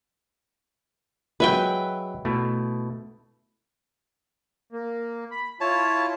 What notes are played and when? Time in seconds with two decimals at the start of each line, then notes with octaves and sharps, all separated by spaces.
1.40 F#3 G#3 B4 E5 G5
2.25 B2 A3 E4
4.73 A#3
5.31 B5
5.61 E4 F4 C#5 A5